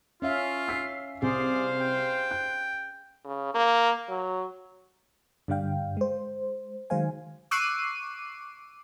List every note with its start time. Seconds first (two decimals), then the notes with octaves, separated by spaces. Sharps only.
0.22 C#4 F4 E5 F5
0.68 E6 B6 C7
1.22 C2 G#4 C5 D5 F5
1.80 G5
2.31 F#6
3.25 C#3
3.54 A#3
4.09 F#3
5.48 G2 D3 G3 D4 F5 G5
5.97 G#3 C5
6.90 D#3 F#3 G#3 C5 F5 G#5
7.51 C#6 D6 E6 F#6 C7 D#7